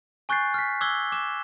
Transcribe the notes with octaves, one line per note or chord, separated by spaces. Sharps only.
G#5 C#6 F#6 G6 A6 C7
F6 B6
D6 E6 F#6 G#6 G7
D6 E7